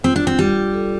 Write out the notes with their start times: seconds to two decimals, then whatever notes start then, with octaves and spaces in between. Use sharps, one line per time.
0.04 C4 F4
0.16 D4
0.22 F4
0.27 C4
0.38 G3 F4
0.56 F4
0.73 A4